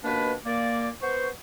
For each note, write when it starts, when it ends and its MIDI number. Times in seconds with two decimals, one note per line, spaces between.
0.04 0.32 39
0.04 0.32 47
0.04 0.32 58
0.04 0.32 62
0.04 0.32 71
0.45 0.89 46
0.45 0.89 58
0.45 0.89 74
1.02 1.28 59
1.02 1.28 72
1.02 1.28 85